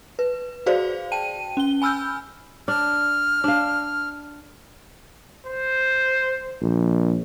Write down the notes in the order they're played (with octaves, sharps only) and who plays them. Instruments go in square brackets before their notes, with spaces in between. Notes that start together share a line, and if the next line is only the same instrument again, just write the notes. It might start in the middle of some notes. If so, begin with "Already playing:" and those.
[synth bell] B4
F#4 G#4 C5 D5 F5
G5 A5 D#7
C#4 G7
G#5 B5 E6 F6 G6
[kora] D4 [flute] F6
[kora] D4 F5
[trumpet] C5
[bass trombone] A#1